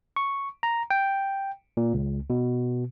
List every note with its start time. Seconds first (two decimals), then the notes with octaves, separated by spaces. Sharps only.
0.16 C#6
0.63 A#5
0.90 G5
1.77 A#2
1.94 C#2
2.30 B2